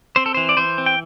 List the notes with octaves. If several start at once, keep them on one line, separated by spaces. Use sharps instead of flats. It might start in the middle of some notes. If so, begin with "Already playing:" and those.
C4 C5
A4
E3 C5
D5
E3 C5
C4
G5